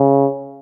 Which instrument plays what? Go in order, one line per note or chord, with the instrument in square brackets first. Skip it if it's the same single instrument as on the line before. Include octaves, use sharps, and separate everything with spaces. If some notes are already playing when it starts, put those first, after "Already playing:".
Already playing: [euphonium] C#3